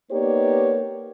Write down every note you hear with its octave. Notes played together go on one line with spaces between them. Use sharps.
A#3 B3 D#4 G4 C#5 D5